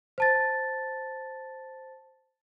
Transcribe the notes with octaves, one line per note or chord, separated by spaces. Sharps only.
C5 A5 A6